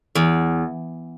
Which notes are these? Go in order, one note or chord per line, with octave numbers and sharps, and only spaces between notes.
E2